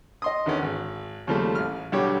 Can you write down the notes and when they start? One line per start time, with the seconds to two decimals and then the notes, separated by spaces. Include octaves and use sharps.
0.22 D#5 C6 D#6
0.46 E2 D3 D#3 B3 C#4
0.62 G#1
1.27 D#2 C#3 F3 G3 A3
1.55 A1 F6
1.92 B1 D3 G3 G4 C#5 D6